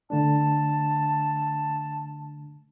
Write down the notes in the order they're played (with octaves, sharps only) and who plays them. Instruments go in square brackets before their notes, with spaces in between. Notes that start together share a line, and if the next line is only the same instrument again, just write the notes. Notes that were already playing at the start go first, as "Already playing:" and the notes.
[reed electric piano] D3 A3 D4 [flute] A5